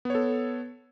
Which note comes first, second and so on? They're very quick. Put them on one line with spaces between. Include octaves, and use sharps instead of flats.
B3 C#5 A4